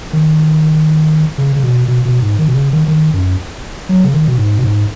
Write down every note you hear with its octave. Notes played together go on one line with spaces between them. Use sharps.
D#3
C#3
C#3
B2
B2
B2
G#2
D#3
B2
C#3
D#3
D#3
F#2
F#3
C#3
D#3
B2
G#2
B2
G#2